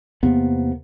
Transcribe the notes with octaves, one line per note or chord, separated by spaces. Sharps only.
E2 C3 A#3 B3